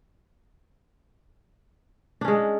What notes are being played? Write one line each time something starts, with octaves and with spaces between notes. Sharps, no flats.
G#3 C#4 D4